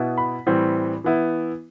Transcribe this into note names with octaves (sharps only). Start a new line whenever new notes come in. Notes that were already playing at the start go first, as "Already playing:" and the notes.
Already playing: B2 B3 E4
B5
A2 E3 G3 C4
E3 B3 E4